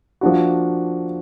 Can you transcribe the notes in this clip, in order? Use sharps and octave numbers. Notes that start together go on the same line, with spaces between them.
F3 A#3 D4 F#4